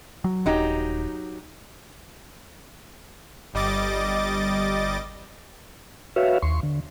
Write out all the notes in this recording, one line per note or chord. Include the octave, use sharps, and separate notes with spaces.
F#3
D#1 F#3 D#4 G4
G1 G3 D#5 D6 A6
F#4 B4 C#5 E5 F5
D#2 C6 C#6
D3